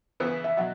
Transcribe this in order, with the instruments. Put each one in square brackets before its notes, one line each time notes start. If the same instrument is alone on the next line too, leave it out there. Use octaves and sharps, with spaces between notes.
[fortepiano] E2 C#3 E3 B3 E4 [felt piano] B4
[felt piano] E5
[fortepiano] B2 F#3 [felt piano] F#5